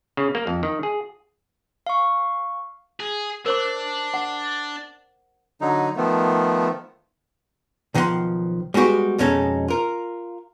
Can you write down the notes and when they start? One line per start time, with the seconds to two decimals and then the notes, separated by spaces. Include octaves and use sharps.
0.17 C#3
0.35 A#3
0.47 F2
0.63 D#3
0.83 G#4
1.87 F5 C#6
3.00 G#4
3.46 D4 A#4 C5 D6
4.14 F#5
5.61 D3 F#3 D#4
5.96 D#3 F3 A3 B3
7.94 B1 D#3 F3 F#5 C6
8.74 G3 G#3 B3 F#4 G4
9.18 F2 B2 G#3 C#4 D#4 A4
9.68 F4 A#4